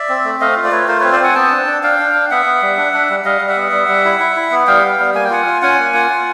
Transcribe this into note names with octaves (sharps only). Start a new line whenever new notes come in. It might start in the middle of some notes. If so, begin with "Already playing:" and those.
Already playing: D5 E5
C4
A3
A3 D#5 F5
F4
D5
A3 B4 C#5
F4 A#4 C5
C4 B4 C#5
C5 D5
C4 F#5 G#5
B3 G5 A5
D4
D4
D4 F5 G5
D4
D4
B3 E5 F#5
B3
G3
D4
D4
G3
G3 D#5 F5
G3
E5 F#5
B3
G3
G3
E4
E4
E4
B3
G3 F5 G5
B3
G3
A#3 G#5
G5
F4 F#5 G#5
F4
C#4 F#5 G#5
A#3
F4
F4